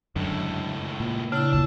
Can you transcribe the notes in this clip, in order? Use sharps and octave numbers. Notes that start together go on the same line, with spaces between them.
C#2 F#2 A2 D3
A#2
C#3 D4 E4
F#1 D2 A#2 A5